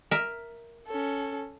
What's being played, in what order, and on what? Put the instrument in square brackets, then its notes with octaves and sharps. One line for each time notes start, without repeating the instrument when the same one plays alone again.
[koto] A#4 E5
[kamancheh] C#4 A4